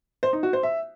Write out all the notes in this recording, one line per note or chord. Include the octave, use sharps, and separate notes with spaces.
C5
D#4
F#4
C5
E5